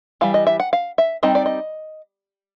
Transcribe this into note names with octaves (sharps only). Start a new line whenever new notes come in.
E3 G3 F5
D#5
E5
F#5
F5
E5
G3 C4 D#4 D#5
D5
D#5